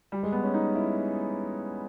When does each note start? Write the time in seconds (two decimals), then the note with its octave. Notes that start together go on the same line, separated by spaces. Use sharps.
0.12 G3
0.23 G#3
0.32 B3
0.44 C#4
0.54 D#4
0.75 E4